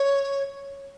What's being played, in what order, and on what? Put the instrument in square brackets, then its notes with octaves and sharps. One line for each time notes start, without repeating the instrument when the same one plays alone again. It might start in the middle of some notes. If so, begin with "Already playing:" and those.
Already playing: [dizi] C#5